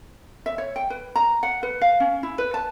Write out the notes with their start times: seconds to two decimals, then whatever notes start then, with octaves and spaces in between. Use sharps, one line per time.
0.46 E5
0.58 C#5
0.76 G5
0.90 B4
1.16 A#5
1.43 F#5
1.63 B4
1.81 F5
2.00 C#4
2.23 E4
2.38 B4
2.54 A5